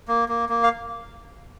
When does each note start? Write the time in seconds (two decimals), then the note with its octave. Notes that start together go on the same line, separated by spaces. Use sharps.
0.08 A#3
0.29 A#3
0.49 A#3
0.63 F5